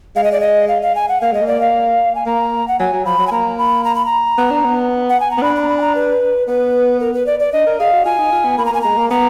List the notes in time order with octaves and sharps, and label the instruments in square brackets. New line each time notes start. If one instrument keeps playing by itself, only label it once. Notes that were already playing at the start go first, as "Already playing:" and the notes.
[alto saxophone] G#3 [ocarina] F5
[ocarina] D#5
D5
D#5
F5
F5
G#5
F#5
[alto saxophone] A#3 [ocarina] F5
[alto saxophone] G#3 [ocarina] D#5
[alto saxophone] A#3
[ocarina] D5
F5
G#5
[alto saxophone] A#3 [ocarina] A#5
[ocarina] F#5
[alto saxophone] F#3 [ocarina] G#5
[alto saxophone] F#3
[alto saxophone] F3 [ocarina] B5
[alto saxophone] F#3
[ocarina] G#5
[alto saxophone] A#3 [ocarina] A#5
[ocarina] B5
A#5
B5
A#5
[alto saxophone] B3
D4
B3
[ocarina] F#5
G#5
A#5
[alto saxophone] B3
[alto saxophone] D4 [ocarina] B5
[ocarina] B5
A#5
B5
G#5
A#5
B4
[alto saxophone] B3 [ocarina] B4
[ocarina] A#4
B4
D5
D5
[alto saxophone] D4 [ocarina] D#5
[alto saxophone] A#4
[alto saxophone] G#4 [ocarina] F5
[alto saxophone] F#4
[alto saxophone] F4 [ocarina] G#5
[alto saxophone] D#4
F4
B3
[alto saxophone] A#3 [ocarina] B5
[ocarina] A#5
[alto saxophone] A#3 [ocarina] G#5
[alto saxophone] G#3 [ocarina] A#5
[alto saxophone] A#3
[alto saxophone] B3 [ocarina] A#5